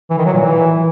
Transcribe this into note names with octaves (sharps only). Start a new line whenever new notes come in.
E3
D#3
F#3
A#2
E3